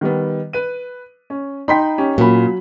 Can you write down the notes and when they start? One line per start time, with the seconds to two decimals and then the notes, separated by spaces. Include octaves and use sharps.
0.01 D#3 G3 B3
0.53 B4 D#7
1.30 C#4
1.68 D#4 G5 B5 C6 B6
1.98 C#4 G4
2.18 A#2 F#3 B5